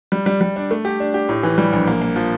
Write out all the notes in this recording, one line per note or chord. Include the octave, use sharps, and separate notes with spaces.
G3
G3
G3
D4
A3
G4
D4
G4
A2
E3
G3
A#1
A#3
A#3
F3